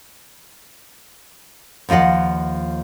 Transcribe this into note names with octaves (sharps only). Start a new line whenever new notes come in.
D#2 F3 F4 D#5 F#5